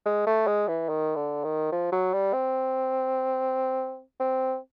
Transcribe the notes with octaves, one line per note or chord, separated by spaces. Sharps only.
G#3
A3
G#3
E3
D#3
D3
D#3
F3
F#3
G3
C4
C4